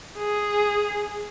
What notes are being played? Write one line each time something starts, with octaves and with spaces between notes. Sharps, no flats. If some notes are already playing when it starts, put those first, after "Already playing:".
G#4